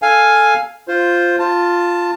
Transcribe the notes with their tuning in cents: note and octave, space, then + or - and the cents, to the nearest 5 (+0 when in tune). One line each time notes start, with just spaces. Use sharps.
A4 +0 F5 +5 G#5 +0
F4 +0 C5 +0
F4 +0 A5 +15